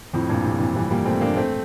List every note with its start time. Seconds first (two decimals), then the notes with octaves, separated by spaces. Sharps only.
0.13 F2 A2
0.29 G2 A#2
0.44 A2 C3
0.60 C3 E3
0.75 E3 G3
0.91 G3 A#3
1.05 A3 C4
1.21 A#3 D4
1.36 A3 C4